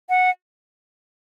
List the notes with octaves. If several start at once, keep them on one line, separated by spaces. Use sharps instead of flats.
F#5